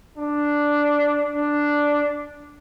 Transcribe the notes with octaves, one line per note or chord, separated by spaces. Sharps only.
D4
D4